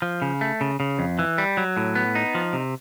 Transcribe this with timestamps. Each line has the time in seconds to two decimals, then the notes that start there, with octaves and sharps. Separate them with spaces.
0.02 F3
0.22 C#3
0.41 A3
0.61 C#3
0.80 C#3
0.99 F2
1.19 E3
1.38 G3
1.57 F#3
1.77 A2
1.95 B3
2.15 D#4
2.35 F3
2.53 C3